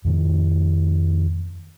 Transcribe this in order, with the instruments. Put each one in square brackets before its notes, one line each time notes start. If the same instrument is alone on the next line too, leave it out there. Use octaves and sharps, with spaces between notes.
[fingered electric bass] F2 A2 D#3